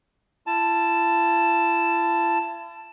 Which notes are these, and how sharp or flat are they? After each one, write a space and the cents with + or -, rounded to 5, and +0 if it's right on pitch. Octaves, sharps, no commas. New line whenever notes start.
E4 +45 A5 +0